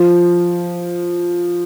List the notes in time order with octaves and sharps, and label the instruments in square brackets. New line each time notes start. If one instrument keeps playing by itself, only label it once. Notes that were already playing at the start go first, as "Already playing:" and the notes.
Already playing: [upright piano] F3